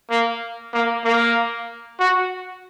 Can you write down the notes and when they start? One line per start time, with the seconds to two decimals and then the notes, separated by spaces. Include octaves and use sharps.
0.11 A#3
0.74 A#3
1.05 A#3
2.00 F#4